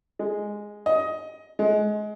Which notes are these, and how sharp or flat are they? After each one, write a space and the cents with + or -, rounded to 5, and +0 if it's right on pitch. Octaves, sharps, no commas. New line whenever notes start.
G#3 +0
D#5 +15
G#3 +25